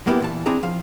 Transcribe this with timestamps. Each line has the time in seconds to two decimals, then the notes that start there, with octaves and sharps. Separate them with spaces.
0.07 F#2 A#3 B3 E4 G4
0.20 A#2 E3 A5
0.46 C4 D4 E4 G#4 A#5
0.63 F3 F5